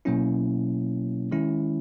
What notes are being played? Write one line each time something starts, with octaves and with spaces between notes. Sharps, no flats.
B2 F#3 A#3 C#4 E4
D#3 G#3 C#4 E4